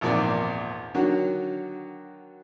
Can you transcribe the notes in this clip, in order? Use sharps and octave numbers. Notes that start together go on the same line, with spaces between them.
G#1 E2 A#2 F3 C4 D5
D3 D#3 F#3 F#4